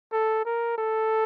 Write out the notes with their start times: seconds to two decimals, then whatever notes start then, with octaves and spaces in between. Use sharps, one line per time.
0.12 A4
0.45 A#4
0.78 A4